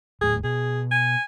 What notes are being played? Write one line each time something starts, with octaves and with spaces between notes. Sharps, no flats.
D#1 A2 G#4
B2 G#4
G#5